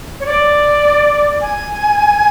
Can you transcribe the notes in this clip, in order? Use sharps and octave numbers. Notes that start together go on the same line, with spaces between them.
C#5
D5
G#5